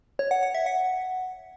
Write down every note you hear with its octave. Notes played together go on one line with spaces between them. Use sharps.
C#5
F#5
F#5
E5
F#5